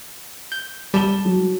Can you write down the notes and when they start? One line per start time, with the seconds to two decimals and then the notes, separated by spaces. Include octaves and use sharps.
0.52 G6
0.94 G3 A5 E7 G7
1.25 F#3